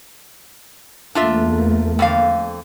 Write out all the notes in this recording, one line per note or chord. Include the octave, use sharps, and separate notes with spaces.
E2 A3 A#3 D4 F4 E5
F2 D3 F5